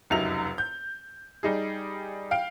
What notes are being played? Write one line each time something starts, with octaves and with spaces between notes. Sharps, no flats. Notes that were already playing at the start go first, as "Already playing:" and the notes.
F1 C#2 F#2 D#4 E5 F7
G6
G3 D#4 G#4
F5 G5 D7